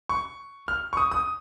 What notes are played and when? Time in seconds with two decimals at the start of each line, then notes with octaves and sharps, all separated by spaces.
0.09 C#6
0.68 F6
0.93 C#6
0.97 D#6
1.12 D#6